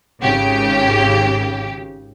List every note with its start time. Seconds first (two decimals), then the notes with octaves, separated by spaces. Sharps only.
0.21 G#1 C#3 G4